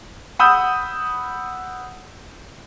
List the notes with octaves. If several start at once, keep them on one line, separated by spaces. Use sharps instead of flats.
F#5 B5 D#6 E6 G6